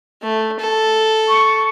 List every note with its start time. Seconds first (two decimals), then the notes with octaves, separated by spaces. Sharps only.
0.23 A3
0.60 A4
1.28 C#6